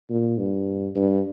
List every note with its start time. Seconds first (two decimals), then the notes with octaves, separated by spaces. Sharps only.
0.10 A#2
0.38 G2
0.95 G2